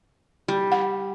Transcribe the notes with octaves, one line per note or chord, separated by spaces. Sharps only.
G3
F#5